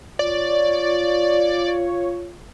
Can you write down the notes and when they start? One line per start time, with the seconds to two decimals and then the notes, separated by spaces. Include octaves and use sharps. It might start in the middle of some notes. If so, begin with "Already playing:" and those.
0.19 F4 C#5 D5